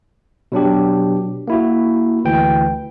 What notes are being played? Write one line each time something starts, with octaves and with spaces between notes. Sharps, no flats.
B2 F#3 D4 G4
A#3 E4 F#4
D2 E3 G5